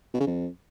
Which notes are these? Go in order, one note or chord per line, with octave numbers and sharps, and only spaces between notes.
B2
C#3
F2